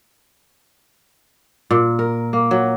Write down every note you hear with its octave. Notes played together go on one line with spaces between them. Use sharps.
A#2
A#4
A#3
F#3